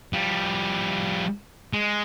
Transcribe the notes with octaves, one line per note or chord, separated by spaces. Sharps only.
F3 G3
G#3